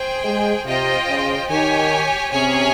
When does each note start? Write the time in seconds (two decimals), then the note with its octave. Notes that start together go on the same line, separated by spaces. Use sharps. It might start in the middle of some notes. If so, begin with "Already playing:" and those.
Already playing: G#4 C5 G5
0.24 G#3
0.65 C3 F4 C5 D#5 G5
1.08 C#3
1.49 D#3 G4 C#5 G#5
2.32 C3 C#4 G#4 C#5 G#5